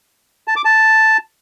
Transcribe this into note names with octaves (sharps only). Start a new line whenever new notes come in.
A5
D6
A5